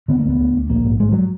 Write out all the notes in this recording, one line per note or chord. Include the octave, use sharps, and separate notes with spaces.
D3 B3
A#3
D2 B3
D2
D2
A#1 A#3
G#2
G#2 G#3
F#3